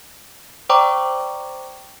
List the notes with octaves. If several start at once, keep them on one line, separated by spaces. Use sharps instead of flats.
C5 D5 G5 A#5 C#6 D6